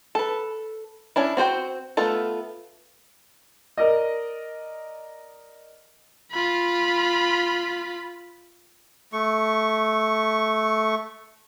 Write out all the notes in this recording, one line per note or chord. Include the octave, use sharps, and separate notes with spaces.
A4 B4
C#4 D4 E4
C4 F#4 C5 G5
A3 B3 F4 A4
A#4 D5 D#5
F4 B5
A3 C#6